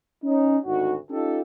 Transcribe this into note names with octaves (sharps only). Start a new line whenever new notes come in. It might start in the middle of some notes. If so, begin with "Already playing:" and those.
C#4 D#4
G#1 D2 D#4 F#4
C#4 D#4 F4 G4 A4